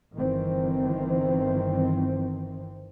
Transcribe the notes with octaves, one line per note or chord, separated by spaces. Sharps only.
G1 D#3 E3 C4